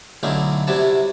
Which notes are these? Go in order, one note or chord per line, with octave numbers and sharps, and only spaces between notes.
B1 D3 A3 C#4 D#4 E4
C3 G3 E4 F#4 C#5 A5